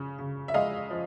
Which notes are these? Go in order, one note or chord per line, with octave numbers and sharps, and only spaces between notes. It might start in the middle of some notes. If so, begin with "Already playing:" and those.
Already playing: C#3
C#3
E5
G#3 D#5 F5
F3